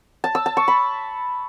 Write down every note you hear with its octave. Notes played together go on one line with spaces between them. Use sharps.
A5
E6
A5
C#6
B5